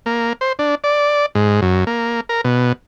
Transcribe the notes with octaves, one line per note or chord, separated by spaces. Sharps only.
A#3
C5
D4
D5
G#2
F#2
A#3
A#4
B2